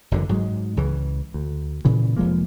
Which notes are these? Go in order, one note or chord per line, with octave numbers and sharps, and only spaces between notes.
F#1 F#2 D3 E3
G#2 F#3 G#3
C#2 C#3 E3
D2
A#2 C#3 E3
F1 F3 G#3 A#3